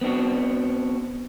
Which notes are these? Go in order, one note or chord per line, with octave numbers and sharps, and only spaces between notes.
B3 C4 D4 F#4